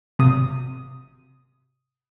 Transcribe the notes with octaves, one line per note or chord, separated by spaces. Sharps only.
G#1 C3 D#6